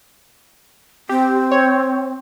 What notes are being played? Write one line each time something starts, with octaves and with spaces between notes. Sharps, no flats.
C4 G4
C#5